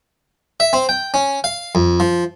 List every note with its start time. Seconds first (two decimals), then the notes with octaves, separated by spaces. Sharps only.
0.60 E5
0.73 C4
0.89 G5
1.14 C#4
1.44 F5
1.75 F2
2.00 F3